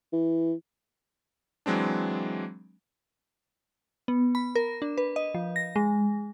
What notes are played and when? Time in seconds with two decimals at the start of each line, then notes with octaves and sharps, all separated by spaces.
0.13 E3
1.66 E3 F#3 G#3 C4 D4
4.08 B3
4.35 B5
4.55 A#4
4.82 D4
4.98 B4
5.16 D#5
5.34 F3
5.56 A#6
5.76 G#3